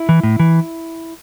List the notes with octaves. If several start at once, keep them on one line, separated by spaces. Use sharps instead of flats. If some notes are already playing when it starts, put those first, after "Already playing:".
Already playing: E4
E3
A2
E3